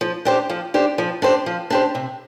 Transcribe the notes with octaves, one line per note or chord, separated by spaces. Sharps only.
F3
D4 G4 C5
F3
D4 G4 C5
F3
D4 G4 C5
F3
D4 G4 C5
C3